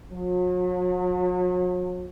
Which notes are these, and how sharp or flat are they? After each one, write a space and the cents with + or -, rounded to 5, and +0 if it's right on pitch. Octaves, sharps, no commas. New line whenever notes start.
F#3 -40